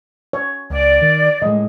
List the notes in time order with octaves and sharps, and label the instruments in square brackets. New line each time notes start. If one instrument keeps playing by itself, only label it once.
[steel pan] C#5
[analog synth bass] C#2 [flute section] D5
[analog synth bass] D#3
[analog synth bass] A2 [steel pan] G#3 D#5